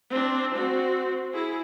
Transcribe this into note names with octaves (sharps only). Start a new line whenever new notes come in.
C4 D4
C4 F#4
E4 G#4